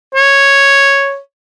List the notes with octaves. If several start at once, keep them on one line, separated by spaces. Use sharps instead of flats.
C#5